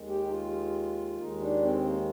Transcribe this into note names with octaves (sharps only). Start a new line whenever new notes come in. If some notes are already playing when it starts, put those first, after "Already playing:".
Already playing: D#2 D#3 G#3
G4
D#4
F4
D#2 D#3 G#3 D#4
D4
C4
A#3